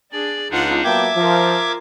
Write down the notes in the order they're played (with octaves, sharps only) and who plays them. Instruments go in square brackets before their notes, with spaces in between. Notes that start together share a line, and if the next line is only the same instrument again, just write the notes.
[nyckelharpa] D4 G#4 [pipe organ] D5
[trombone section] C#2 [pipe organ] D4 D#4 [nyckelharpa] F4 F#5
[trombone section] F#3 A#3 B3 [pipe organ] E5 D6 G#6 [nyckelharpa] G5 A5
[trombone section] F3 [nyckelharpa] F4 A#4